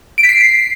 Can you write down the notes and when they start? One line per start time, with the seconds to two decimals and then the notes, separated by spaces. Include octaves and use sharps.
0.18 D7
0.23 B6
0.29 C7